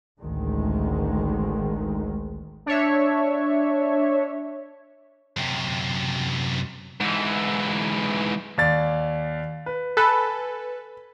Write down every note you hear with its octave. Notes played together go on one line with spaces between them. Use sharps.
A1 D2 D#3 G#3
D4 C#5 E5
F#2 C3
G#2 E3
D#2 D5 A6
B4
A4 B4 G#5